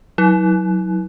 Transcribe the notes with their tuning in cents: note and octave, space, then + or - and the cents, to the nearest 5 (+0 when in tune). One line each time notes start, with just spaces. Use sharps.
F#3 +0 E4 -40